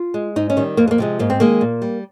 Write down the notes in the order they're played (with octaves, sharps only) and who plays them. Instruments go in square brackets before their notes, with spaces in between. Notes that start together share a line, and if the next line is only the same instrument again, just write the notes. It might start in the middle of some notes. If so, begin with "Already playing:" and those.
Already playing: [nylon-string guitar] F4
G#3
G#2 D#4
C#4
D#3 G3
F2 A#3
G#3
A#3
C3 F3 G#3
G#2 A#3
C4
D#3 G#3 A#3
A#2
G3